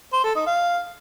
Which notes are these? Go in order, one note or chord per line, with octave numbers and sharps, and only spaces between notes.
C5
A4
D#4
F5